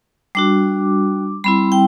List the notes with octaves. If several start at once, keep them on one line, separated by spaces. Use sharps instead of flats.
G3 D4 F#4 D6
G3 C4 E4 B5
G5